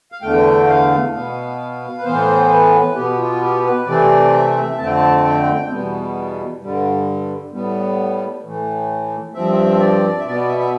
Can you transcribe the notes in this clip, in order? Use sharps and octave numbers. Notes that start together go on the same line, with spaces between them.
F5
E2 D3 A3 G5
F5
B2 B3
B4
A2 E3 B3 C5
B4
B2 B3 G4
F4
G4
B4
C3 E3 A3 C4 D5
E5
F2 D3 A3 C4 A5
G5
A5
G5
E2 B2 G3 B3
G2 D3 G3
A2 G3 B3
A2 E3 A3
G2 F3 C4 E5
D5
E5
B2 B3 D5
E5
E5